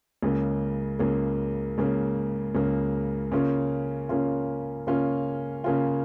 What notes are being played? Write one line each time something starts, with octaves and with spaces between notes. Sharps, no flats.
C#2 C#3 A#3
C#2 C#3 A#3
C#2 C#3 A#3
C#2 C#3 A#3
C#3 A#3 C#4 F4
C#3 A#3 C#4 F4
C#3 A#3 C#4 F4
C#3 A#3 C#4 F4